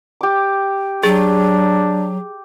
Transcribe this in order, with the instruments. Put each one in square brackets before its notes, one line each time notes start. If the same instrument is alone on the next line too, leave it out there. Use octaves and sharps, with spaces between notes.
[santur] G4 D6
[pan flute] F#3 [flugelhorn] D4 [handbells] G#4